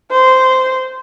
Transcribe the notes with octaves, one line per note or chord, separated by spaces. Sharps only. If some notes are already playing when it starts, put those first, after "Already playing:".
C5